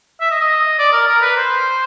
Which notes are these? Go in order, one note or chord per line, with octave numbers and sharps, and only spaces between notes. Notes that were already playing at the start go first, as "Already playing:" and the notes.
E5
D#5
D#5
D5
A#4
A#4
B4
C5